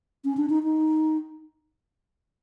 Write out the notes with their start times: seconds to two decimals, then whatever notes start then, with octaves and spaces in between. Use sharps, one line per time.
0.24 C#4
0.37 D4
0.50 D#4
0.63 D#4